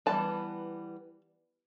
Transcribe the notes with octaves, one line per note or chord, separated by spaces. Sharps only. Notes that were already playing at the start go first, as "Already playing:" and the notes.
E3 G3 B3 A5